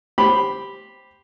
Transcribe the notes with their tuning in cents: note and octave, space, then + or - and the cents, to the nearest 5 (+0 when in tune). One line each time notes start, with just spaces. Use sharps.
G4 +0 C5 +0 B5 +0